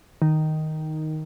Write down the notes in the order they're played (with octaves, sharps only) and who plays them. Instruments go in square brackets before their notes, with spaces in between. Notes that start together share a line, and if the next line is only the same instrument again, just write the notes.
[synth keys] D#3